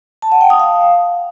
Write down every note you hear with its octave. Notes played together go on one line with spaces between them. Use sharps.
A5
F#5
G5
D#6
F5